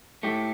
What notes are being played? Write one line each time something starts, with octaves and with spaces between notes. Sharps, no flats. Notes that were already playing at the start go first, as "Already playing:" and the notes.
A2 A3 G4